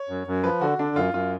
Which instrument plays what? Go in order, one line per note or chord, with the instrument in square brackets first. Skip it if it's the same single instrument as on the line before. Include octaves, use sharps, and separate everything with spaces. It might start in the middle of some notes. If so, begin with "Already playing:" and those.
Already playing: [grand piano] C#5
[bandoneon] F#2
F#2
[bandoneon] F3 [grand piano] B4
[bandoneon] D3 [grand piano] F#4
[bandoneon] D3 [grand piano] D4
[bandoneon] F#2 [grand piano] F4
[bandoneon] F#2 [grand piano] F4